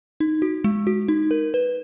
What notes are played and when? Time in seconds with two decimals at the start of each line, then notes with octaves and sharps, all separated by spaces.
0.20 D#4
0.42 F#4
0.64 G#3
0.87 F#4
1.08 D#4
1.31 A#4
1.54 B4